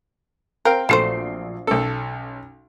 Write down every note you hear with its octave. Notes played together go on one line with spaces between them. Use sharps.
C4 A#4 F5 G5
A#1 F#3 A3 C5 C7
B1 C#4 A4